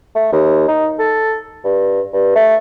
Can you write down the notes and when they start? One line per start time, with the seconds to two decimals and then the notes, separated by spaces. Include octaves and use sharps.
0.15 A3
0.32 D#2
0.68 D#4
0.99 A4
1.65 G2
2.13 G2
2.35 A3